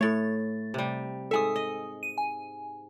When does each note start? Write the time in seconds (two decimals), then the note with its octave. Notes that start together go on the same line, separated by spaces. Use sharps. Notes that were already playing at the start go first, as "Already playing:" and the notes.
0.01 A2 A3 C#5 A6
0.74 C3 G3
1.31 G#2 A4 E5 G#5 D#6
1.56 D#5
2.03 D#7
2.18 G#5